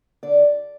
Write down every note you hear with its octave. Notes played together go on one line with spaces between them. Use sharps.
D3 D5
D2